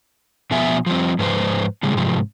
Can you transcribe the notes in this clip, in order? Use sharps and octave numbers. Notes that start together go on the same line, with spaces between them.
B2 F3 B3 E5 G#5
F3 G3 C4
G#2 F3 B4 C5
A2 C#3 G3 G#3
G#2 C3 F3